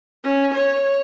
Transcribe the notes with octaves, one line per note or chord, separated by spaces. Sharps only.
C#4
C#5